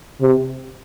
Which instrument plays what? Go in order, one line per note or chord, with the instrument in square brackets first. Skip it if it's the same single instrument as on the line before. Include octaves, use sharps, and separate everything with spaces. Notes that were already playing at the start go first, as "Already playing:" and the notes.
[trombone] C3